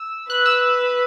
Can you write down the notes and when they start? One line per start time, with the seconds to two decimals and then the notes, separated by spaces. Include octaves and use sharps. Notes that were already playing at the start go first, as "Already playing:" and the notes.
Already playing: E6
0.29 B4 F#6
0.46 E6